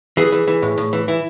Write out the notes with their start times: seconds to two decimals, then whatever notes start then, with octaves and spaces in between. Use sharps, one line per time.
0.17 E3 G#4
0.32 E3
0.48 E3
0.62 A2
0.78 A2
0.93 E3
1.08 E3 E4